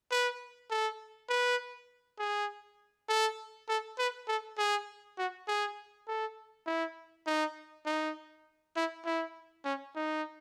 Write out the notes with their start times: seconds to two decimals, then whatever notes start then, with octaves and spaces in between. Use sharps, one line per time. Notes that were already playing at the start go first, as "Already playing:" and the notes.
0.11 B4
0.71 A4
1.29 B4
2.19 G#4
3.09 A4
3.69 A4
3.98 B4
4.28 A4
4.58 G#4
5.18 F#4
5.48 G#4
6.08 A4
6.66 E4
7.27 D#4
7.86 D#4
8.76 E4
9.06 E4
9.65 C#4
9.96 D#4